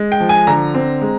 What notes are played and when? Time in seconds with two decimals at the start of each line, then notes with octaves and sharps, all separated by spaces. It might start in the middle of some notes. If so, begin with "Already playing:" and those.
Already playing: G#3
0.12 G5
0.20 F3
0.29 G#5
0.47 D3 A#5
0.74 C4
1.01 G#3